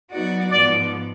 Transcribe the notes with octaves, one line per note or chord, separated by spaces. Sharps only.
F#3 B3 D#4 F#4 D5
G#2 F3 B3 D5